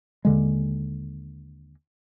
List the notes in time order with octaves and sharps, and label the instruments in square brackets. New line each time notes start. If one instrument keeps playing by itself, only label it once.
[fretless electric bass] D#2 D3 G#3